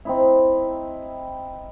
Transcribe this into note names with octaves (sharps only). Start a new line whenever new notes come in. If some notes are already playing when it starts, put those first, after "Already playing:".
C4 D#4 E4